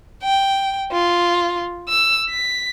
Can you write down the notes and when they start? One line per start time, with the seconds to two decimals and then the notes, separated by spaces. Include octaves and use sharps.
0.23 G5
0.93 F4
1.89 E6
2.30 B6